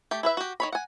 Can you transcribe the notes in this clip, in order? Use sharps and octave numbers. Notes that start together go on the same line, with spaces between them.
A3 G4
E4 B4 E5
F#4 G4
D#3 C#5 B5
F#5 G#5